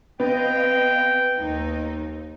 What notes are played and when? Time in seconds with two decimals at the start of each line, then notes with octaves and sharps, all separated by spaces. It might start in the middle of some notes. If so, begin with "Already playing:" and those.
0.20 B3 C4 D#5 F5 G5
1.38 D#2 D#4